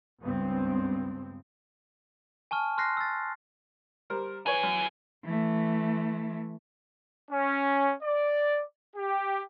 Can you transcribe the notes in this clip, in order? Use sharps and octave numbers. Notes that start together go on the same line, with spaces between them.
C#2 G2 B3 C4
G#5 A5 C#6 F6
C6 F6 F#6 A#6 C7
E6 A6
G3 A#4 C5
E3 G#4 B4 C#5
F#2
E3 A3
C#4
D5
G4